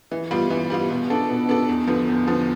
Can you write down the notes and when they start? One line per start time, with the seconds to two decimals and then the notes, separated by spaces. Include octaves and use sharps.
0.11 E3
0.31 G3 B3 F4
0.50 E3
0.70 G3 B3 F4
0.90 B2
1.10 B3 D4 A4
1.30 B2
1.49 B3 D4 A4
1.69 E2
1.87 D3 F3 B3
2.08 E2
2.27 D3 F3 B3